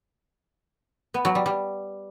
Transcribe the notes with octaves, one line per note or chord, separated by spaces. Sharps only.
B3
F#3
G3
G3